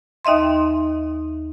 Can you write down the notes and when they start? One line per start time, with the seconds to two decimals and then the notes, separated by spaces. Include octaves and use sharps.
0.25 D#2 D#4 D#5 E5 C6